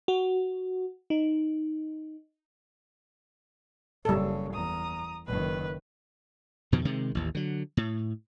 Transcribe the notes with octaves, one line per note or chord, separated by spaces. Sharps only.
F#4
D#4
F#1 C#3 G3 A4
E2 A#5 D#6
F#1 D#3 B4
F2 B2 D#3 F3
C3 D#3 G#3
A1 D#2
D3 F#3
A2